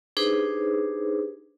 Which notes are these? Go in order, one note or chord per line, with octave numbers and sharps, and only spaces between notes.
D4 D#4 G4 G#4 B4 C5